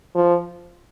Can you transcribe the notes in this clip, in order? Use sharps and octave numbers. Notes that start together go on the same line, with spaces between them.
F3